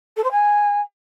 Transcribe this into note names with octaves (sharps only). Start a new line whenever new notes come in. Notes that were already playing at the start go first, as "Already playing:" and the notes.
A4
C5
G#5